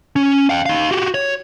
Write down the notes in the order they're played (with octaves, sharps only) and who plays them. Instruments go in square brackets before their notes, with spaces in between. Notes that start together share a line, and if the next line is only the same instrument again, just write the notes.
[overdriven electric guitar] C#4
F5 G5
D#4 F5
F#4 G4
C#5